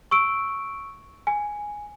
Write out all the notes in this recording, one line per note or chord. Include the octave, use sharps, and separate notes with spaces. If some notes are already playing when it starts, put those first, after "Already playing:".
C#6 E6 D7
G#5